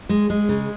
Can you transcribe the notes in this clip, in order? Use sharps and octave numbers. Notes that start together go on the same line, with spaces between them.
G#3
G#3
C#3